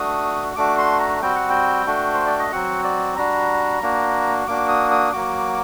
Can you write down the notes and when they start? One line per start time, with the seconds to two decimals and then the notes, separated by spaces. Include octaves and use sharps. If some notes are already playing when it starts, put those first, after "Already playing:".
Already playing: A3 D4 F#4 D#6
0.56 A3 D4 F#4 D6
0.78 C6
1.00 A#5
1.21 G3 C4 F#4 G5
1.35 F#5
1.50 G5
1.86 A3 D4 F#4
2.14 C5
2.26 D5
2.39 D#5
2.51 F#3 C4 F#4 F#5
2.84 D5
3.16 G3 D4 F#4 A#5
3.82 A#3 D4 F#4
4.47 A#3 D4 F#4 D6
4.68 D#6
4.91 D#6
5.12 F#3 A#3 F#4 D6